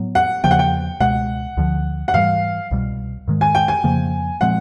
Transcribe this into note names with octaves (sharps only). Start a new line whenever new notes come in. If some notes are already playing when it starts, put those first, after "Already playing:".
Already playing: A2 F#3 B3
F#5
E2 C#3 F3 A#3 G5
F#5
G5
C#2 B2 G#3 F#5
D2 D3 F3
F#5
G#2 E3 G3 F5
C2 B2 G3
G#2 D#3 G#3
G#5
G5
G#5
F2 C#3 F3 A#3
A#2 F3 G#3 C4 F#5